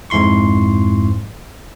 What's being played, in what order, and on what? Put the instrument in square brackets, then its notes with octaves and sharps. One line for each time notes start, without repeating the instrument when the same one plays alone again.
[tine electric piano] F2 G#2 E4 C6 C#6